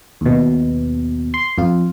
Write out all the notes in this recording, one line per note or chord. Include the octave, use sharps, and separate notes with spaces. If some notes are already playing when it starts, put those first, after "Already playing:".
D#2 B2
C6
F2 F4